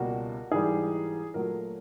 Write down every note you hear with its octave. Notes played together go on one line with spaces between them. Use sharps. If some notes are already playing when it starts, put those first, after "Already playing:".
Already playing: C#2 B2 G3 A#3 F#4
G#2 E3 G3 G#4
A#2 F#3 A3 A#4